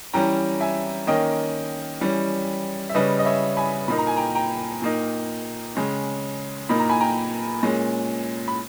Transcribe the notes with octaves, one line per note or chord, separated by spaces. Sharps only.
E3 G3 C#4 G5 A#5
E5 G#5
D#3 A#3 C#4 D#5 G5
E3 G3 C#4
E5
C#3 G3 C#4 B4 D#5
D#5
C#5 E5
G#5 B5
A#2 A#3 D#4 B5
A#5
G#5
G5 A#5
G5 A#5
A#2 A#3 D#4
C#3 G#3 C#4
A#2 A#3 D#4 B5
A#5
G#5 B5
G5 A#5
A#2 G#3 C#4
B5